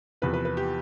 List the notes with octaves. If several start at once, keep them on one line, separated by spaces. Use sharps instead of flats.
E2 C3 F3 B4
B4
B4
G4